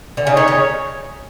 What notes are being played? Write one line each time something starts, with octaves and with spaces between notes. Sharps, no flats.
D3
C#3 D#4 G#4 C#5
D#3
C#3